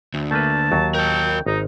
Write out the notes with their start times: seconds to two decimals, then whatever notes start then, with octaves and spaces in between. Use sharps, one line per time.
0.14 D2
0.31 A3 A#3 B4 A5
0.72 D#2 F#3
0.95 A#4 G5 A5
1.46 G#1 D#4